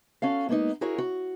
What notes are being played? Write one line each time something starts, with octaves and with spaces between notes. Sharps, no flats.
C#4 F#4 A4 F5
G#3 A#3 B3 D4 D#4
E4 F#4 G#4 A#4 C#5
F#4